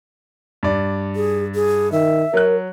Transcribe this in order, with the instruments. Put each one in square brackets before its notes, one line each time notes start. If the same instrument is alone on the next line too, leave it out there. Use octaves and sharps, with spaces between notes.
[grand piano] G2 D5
[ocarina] G#4
G#4
[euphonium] D#3 [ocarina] E5
[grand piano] F#3 F#6 [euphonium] A#4